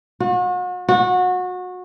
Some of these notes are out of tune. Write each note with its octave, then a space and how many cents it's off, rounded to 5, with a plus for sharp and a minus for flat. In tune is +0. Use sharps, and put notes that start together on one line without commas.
F#4 -40
F#4 -25